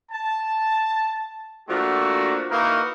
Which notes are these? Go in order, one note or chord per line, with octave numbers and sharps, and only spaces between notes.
A5
F3 A3 A#3 D4 F#4
A#3 D#4 E4 F#4 A#4 B4